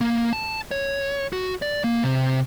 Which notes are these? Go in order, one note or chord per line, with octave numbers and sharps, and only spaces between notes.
A#3
A5
C#5
F#4
D5
A#3
C3